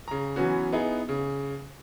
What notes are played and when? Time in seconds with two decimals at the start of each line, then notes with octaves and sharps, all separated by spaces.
0.08 C#3 A#5
0.36 E3 F#3 B3 C#4 F#4
0.73 B3 D#4 E4 G#4
1.09 C#3